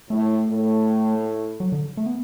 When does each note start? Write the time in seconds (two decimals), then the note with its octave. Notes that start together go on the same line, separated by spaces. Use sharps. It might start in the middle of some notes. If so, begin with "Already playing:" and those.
0.10 A2 A3
0.48 A2
1.60 F#3
1.72 D3
1.97 A3
2.06 B3